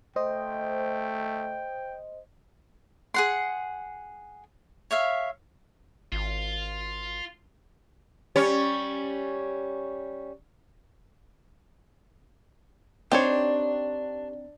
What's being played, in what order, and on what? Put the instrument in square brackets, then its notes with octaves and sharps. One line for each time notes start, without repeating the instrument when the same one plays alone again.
[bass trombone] A3 [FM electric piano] C5 D#5 [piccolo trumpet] G5
[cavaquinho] G#4 F#5 C6
C#5 E5 F5
[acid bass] G#1 [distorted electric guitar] F4
[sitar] G3 C#4 C#5
[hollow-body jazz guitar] C4 D#4 [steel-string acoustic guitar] D4 [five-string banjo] G4 C5 C#5